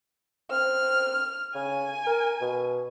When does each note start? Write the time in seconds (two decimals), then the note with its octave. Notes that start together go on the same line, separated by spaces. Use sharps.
0.51 C4 F6
1.55 C#3 G#5
2.07 A#4
2.41 B2